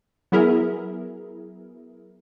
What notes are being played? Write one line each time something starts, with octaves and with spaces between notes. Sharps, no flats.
F#3 B3 E4 G#4 A#4